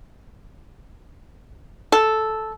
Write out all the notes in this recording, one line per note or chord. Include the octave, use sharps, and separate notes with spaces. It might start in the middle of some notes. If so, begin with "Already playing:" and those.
A4